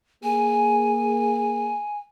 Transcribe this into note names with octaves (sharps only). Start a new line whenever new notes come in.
A#3 G#4 G#5